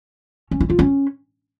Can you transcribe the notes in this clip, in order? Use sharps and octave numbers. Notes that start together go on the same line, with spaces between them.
C#4
E4
F4
C#4